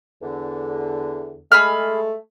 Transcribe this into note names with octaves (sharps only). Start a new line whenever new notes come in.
E2 D3
G#3 A3 G#4 B5 F6